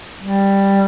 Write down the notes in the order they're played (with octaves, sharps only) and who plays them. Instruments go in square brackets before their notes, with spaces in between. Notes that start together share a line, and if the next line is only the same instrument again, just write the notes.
[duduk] G3